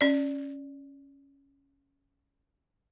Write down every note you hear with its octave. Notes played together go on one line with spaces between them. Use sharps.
C#4 D5